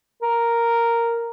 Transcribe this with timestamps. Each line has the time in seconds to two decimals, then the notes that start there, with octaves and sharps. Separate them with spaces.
0.22 A#4